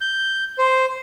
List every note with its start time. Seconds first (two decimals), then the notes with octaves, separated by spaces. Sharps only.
0.01 G6
0.58 C5